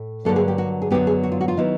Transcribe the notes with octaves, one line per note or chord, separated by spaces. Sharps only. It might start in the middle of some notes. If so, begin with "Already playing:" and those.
Already playing: A2
G2 D3 F#3 A#3 A4
G#4
G4
F#4
G#4
F#2 D3 F#3 B3 G4
G#4
F#4
F4
F#4
F4
D#3 F#3 B3 E4